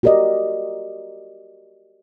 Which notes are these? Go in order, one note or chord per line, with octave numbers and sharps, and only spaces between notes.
F#4 G4 A#4 D5 D#5